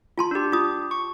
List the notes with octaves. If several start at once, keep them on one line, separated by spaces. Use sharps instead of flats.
F4 A5 C6
D4 G4
F4 D#6
C#6